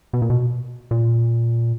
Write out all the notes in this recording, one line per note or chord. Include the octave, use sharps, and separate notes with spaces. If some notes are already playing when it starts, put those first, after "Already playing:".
B2
A#2
B2
A#2